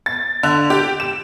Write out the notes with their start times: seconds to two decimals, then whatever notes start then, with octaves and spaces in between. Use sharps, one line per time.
0.06 A6
0.43 D3
0.70 G4
1.00 E7